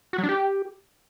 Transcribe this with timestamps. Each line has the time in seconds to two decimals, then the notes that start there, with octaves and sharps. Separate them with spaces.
0.13 F#4
0.18 F#3
0.24 D4
0.29 G4